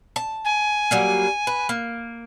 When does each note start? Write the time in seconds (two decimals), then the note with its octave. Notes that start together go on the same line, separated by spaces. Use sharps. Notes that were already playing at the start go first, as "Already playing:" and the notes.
0.16 A5
0.45 G#5
0.91 F#3 G3 A#3
1.47 B4
1.69 A#3